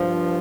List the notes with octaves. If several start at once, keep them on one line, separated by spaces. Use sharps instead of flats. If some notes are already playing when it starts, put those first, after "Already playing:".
Already playing: G2 F3